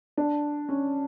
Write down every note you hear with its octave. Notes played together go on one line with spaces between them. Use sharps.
D4
C#4